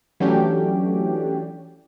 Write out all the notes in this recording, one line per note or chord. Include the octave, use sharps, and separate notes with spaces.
E3 F#3 A3 C#4 D4 G4